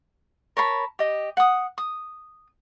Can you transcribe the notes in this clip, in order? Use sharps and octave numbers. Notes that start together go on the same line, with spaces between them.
A#4 C#5 A5 B5
G4 D#5
F#5 D#6
D#6